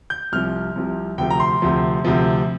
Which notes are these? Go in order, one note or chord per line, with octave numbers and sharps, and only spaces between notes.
G6
C2 C3 F3 F6
C2 C3 F3
D2 C3 F3 G5
A#5
C6
D2 C3 F3
D2 C3 F3